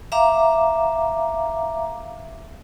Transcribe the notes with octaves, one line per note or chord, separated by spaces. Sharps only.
E5 F5 A#5 D6